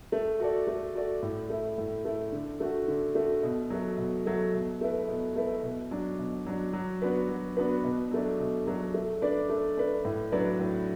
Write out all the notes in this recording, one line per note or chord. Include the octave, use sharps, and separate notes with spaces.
A3
F#4 A4 D5
A3
F#4 A4 D5
A2
A3 E4
A2
A3 E4
D3
A3 F#4
D3
A3 F#4
B2
F#3 A3
B2
F#3 A3
B2
A3 E4 B4
B2
A3 E4 B4
B2
F#3 D4
B2
F#3 D4
F#3
B3 D4 F#4 B4
F#3
B3 D4 F#4 B4
B2
F#3 A3 D4
B2
F#3 A3 D4
A3
D4 B4 D5
A3
D4 B4 D5
A2
F#3 D4 B4 D5
A2